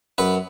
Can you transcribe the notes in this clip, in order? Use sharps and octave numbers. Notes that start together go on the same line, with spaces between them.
F#2 B4